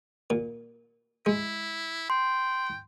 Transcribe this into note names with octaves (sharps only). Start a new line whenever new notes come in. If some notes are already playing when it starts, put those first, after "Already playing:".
A#2
G#3 E4
G5 C6